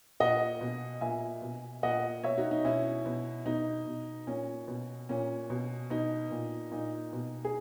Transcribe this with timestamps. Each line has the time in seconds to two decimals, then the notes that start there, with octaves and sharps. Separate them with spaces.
0.20 A#2 D#5 F#5
0.61 B2
1.01 A#2 E5 G#5
1.42 B2
1.83 A#2 D#5 F#5
2.23 B2 C#5 E5
2.37 D#4 F#4
2.51 D#4
2.64 B2 C#4 E4
3.06 B2
3.45 B2 D#4
3.86 B2
4.27 A#2 C#4
4.68 B2
5.09 A#2 C#4
5.50 B2
5.90 B2 D#4
6.31 A#2
6.72 A#2 D#4
7.13 B2
7.45 G#4